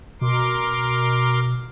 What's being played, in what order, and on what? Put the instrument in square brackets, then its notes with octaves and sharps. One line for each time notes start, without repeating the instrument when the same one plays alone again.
[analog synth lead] B2 [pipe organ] A#4 C6 D6